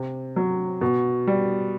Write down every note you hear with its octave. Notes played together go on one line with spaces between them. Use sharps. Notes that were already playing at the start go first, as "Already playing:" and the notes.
Already playing: C3
F#3
B2
G3